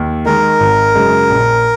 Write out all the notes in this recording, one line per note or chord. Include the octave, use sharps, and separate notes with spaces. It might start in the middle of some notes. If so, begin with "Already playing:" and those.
Already playing: D#2
D#3 G#3 A#4
G#1
F#2 C#3 G#3
A#1